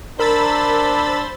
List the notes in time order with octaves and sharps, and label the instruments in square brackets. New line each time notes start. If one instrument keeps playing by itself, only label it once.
[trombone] D4 [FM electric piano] A#4 [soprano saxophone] C5 [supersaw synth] B5 E6 A6